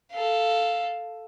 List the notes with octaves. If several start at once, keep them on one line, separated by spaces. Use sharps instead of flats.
A4 F5